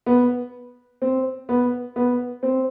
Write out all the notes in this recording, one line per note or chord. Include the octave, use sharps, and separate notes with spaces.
B3
C4
B3
B3
C4